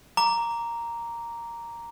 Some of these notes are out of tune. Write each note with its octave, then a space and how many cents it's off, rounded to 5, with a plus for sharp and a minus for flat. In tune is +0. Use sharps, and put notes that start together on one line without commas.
A#5 +0 D6 -15